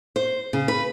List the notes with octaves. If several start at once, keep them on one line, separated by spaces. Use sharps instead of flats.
C5
C#3
B4